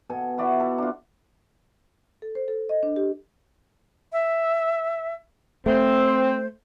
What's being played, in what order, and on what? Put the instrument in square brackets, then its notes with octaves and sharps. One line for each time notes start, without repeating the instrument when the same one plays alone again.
[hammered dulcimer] B2 A4 G#5
E4 F#4 D5 E5
A4
D4 F4
[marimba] A4
C5
A4
D#5
D4
G4
[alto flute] E5
[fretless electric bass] A3 [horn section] C4 [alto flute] C5